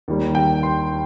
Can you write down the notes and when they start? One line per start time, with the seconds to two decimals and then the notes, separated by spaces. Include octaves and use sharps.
0.08 D#2 D#3 G3
0.35 G5
0.63 C6